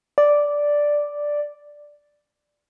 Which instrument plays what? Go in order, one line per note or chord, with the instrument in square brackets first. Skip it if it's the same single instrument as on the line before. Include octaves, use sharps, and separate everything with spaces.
[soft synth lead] D5